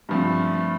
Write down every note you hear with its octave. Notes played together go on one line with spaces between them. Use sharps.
G2 F3 A3 C4